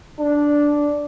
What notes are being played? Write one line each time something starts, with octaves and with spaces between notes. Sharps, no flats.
D4